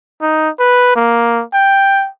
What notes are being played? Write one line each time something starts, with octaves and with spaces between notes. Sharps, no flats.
D#4
B4
A#3
G5